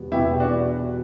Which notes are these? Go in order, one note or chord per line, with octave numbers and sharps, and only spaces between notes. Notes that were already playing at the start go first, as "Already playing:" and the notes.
Already playing: E2 B2 G3 B3
E2 B2 G3 B3 E4 G4
D4 F#4